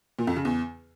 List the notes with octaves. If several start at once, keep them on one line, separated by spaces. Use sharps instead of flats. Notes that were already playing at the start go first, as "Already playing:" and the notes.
A#2
F2
C#3
E2